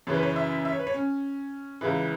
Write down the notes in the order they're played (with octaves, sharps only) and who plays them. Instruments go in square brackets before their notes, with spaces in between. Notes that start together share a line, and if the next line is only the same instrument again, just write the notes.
[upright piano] F#2 C#3 E3 C#5
B4
C#5
E5
E5
C#5
B4
C#5
C#4
C#2 C#3 E3 E4